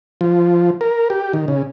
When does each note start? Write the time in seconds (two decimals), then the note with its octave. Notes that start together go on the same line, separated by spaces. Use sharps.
0.21 F3
0.81 A#4
1.10 G4
1.33 D#3
1.48 C#3